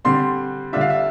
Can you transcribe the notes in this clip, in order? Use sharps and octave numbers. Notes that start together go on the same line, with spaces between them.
D3 G3 C4 C6
D3 G3 D4 F4 E5
F5
E5